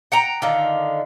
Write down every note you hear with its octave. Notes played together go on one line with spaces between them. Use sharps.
F#5 G5 A#5
D3 D#3 F4